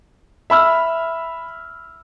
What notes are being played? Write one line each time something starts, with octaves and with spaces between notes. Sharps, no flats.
E5 B5 E6 F6